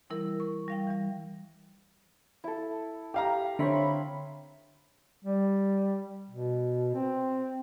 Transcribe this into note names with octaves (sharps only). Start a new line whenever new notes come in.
E3 G3 E4 A#4 E6
C#6
G3 F5 G5
E3 G3
E4 A4
G4 F5 A#5
D3 C4 C#5 E5 B5
G3
B2
C4